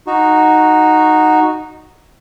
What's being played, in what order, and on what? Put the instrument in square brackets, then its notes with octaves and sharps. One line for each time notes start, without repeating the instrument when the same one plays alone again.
[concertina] D#4 F#4